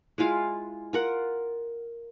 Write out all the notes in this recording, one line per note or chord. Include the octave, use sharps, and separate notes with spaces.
G#3 E4 F4 F5
F4 A#4 F#5